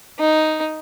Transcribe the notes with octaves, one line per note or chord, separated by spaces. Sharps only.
D#4